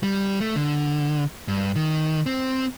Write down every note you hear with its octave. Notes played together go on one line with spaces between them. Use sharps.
G3
A3
D3
G2
D#3
C4